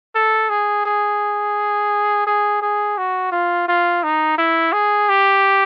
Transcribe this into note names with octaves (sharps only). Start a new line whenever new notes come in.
A4
G#4
G#4
G#4
G#4
F#4
F4
F4
D#4
E4
G#4
G4